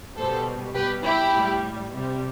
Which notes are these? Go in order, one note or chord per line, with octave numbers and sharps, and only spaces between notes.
B2 G3 A4 C5
B2 G3 G4 B4
E4 G4
A2 G3
C3 G3